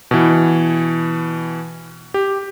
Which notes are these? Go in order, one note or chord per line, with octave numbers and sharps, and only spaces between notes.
B2 E3
G4